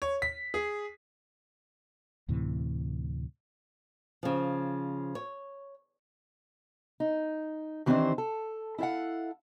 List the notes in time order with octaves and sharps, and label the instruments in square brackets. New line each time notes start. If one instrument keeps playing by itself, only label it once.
[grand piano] C#5
B6
G#4
[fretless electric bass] D2 A2 C3 E3
[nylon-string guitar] C#3 F3
C#5
[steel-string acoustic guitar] D#4
D#3 E3 C4 D4 G4 C5
A4
E4 A4 C5 F5 F#5